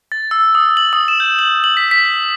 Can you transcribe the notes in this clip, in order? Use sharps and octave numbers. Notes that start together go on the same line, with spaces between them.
A6
E6
D#6
F#7
D#6
E7
G6
F#7
F#7
B6
B6